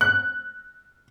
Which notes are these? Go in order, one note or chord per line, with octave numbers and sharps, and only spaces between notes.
F#6